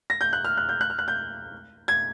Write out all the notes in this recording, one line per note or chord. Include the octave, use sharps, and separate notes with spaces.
A#6
G6
F#6
F6
F#6
G6
F#6
F6
F#6
G6
G#6